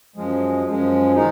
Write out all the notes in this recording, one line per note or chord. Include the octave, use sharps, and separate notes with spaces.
F#2 F3 G#3
F#2 F3 G#3
D#3 G#3 D#4